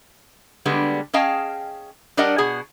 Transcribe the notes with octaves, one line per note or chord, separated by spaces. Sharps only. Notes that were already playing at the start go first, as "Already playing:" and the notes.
D3 G3 G#3 B3
C#4 G#4 D#5 F5 G5 A5
G3 D4 A#4 D5 D#5 F#5
B2 G#4 F#5